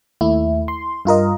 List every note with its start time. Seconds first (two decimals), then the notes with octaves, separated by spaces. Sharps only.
0.21 D#2 A3 E4
0.68 C6
1.05 G2 F4 A#4 D#5